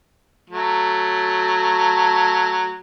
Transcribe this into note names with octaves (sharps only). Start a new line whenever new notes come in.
F#3 A3